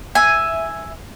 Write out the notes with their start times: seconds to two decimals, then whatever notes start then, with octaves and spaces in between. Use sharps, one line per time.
0.15 E5 G#5